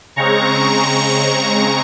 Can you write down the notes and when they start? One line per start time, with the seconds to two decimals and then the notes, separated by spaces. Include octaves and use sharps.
0.16 C#3 G#3 C4 A#5 C#6